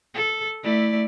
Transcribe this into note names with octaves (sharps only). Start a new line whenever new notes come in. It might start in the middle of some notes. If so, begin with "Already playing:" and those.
A4
A3 E4 D5